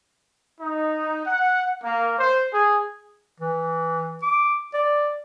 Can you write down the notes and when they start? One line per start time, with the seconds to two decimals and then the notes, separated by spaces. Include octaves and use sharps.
0.60 D#4
1.26 F#5
1.83 A#3
2.18 C5
2.53 G#4
3.40 E3
4.22 D6
4.74 D5